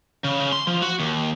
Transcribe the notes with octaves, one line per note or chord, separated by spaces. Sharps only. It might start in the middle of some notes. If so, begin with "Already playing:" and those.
C#3
C#3
C6
F3
F#4
D#2